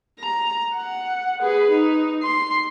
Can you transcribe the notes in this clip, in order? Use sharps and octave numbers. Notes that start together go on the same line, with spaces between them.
A#5
F#5
G#4 B4
D#4
C6